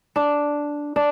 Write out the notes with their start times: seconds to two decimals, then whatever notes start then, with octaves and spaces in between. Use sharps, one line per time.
0.16 D4
0.96 D4